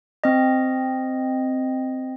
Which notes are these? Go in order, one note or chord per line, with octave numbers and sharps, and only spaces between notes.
C4 D#5